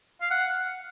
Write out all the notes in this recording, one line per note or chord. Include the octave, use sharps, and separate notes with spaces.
F5
F#5